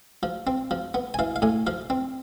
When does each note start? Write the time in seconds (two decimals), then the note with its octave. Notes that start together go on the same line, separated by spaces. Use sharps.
0.23 F3
0.47 C4
0.71 F3
0.94 B3
1.14 G#5
1.19 E3 F5
1.36 F5
1.42 A2 G#5
1.67 F3 F5
1.90 C4